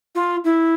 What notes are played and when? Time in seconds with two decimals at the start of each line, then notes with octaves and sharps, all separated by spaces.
0.15 F4
0.45 E4